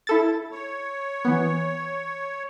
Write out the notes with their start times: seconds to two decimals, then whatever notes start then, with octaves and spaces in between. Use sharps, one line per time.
0.07 E4 A4 A6
0.51 C#5
1.25 E3 B3